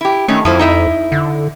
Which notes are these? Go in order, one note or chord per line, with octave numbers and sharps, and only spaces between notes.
E4 G4
D#3 A3 C#4
F2 F3 E4 C5
D#4 E4 E5
D3